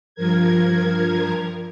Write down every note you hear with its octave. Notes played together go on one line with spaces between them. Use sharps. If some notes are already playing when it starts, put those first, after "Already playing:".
G2 F3 A#4 G#6